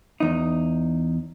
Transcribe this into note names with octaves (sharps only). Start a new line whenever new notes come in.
E2 D#4